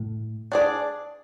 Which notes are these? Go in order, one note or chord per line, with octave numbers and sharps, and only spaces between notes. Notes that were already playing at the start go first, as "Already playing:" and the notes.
Already playing: A2
D4 G#4 D5